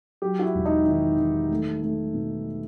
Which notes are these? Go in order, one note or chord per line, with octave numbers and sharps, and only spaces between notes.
F#3 G4
F#4
E4
E1
D#4
D#3 E4
D#3
A3
A3
B2